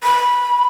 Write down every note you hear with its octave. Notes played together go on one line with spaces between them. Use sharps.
B5